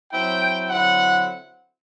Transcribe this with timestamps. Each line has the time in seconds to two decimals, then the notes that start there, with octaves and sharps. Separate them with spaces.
0.12 F#3 C4 E4 G5
0.69 D3 F#3 C4 E4 F#5